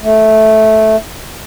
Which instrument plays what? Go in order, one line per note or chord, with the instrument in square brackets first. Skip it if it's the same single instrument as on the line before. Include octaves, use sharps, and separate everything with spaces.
[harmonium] A3